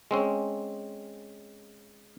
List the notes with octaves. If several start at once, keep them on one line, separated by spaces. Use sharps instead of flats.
G#3 C4 C#4